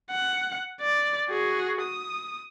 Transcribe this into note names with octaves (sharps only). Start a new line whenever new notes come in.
F#5
D5
F#4 G#4
D#6